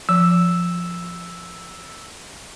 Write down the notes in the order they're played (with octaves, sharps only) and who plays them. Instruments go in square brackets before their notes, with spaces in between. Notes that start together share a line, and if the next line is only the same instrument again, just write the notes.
[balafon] F3 [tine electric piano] E6